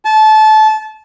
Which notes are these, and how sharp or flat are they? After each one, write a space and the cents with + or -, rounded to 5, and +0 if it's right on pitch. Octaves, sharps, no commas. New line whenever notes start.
A5 -25